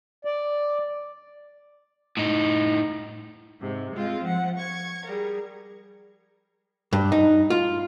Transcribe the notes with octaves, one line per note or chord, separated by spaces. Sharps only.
D5
A2 D#4
G#2 C3
G#3 C4 F4
F3 F#5
C#6 G#6
G3 G#4 A#4
G2
D#4
F4